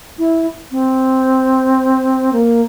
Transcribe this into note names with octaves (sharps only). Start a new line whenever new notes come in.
E4
C4
A#3